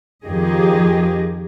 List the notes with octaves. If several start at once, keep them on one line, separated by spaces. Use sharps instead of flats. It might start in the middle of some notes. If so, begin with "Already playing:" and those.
F2 D#3 F3 G4 G#4 D#5